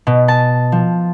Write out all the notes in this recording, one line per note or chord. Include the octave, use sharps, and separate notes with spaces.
B2
A5
F3